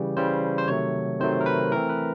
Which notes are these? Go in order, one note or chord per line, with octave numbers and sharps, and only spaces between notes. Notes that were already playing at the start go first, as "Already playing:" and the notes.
Already playing: C#3 E3 G3 G4
C#3 E3 G3 C5
C5
C3 D#3 F#3 A3 C#5
C3 D#3 F#3 A3 C5
A#4
B4
E3 A3 C4 A#4
B4